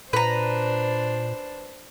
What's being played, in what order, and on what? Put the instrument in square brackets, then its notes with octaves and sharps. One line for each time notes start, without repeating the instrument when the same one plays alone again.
[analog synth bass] A#2 [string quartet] D4 C5 [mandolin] B4 A#5